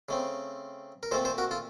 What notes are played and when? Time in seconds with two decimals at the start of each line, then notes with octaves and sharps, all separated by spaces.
0.09 C#3 A3 C4
1.03 A#4
1.11 A#2 A3 C4 A4 C5
1.25 A4 C5
1.38 F#4 A#4
1.51 F4 A4